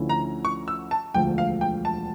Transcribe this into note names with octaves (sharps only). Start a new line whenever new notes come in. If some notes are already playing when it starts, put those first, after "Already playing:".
Already playing: D2 D3 F3 C#4 E4
A#5
C#6
E6
A5
E1 D2 D3 F3 G5
F5
G5
A5